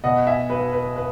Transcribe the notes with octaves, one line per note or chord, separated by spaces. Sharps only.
B2 D#5 F#5
E5 G#5
B1 B4
B4
B4